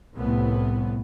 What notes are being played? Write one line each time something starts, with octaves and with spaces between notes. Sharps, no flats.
C2 A2 B3